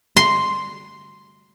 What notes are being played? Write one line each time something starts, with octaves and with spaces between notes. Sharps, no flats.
C6